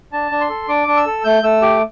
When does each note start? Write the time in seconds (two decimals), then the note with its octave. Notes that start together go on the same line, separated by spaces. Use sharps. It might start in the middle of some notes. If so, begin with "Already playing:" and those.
0.12 D4 A5
0.31 D4
0.41 C6
0.49 A4
0.68 D4 D6
0.88 D4
0.97 E6
1.06 A4
1.25 A3 G6
1.43 A3 E6
1.62 G4 D6